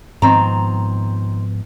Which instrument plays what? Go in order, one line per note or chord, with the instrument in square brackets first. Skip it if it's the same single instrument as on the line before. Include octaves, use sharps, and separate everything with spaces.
[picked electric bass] G#2 F3 B3 [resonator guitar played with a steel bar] D#3 C4 A#5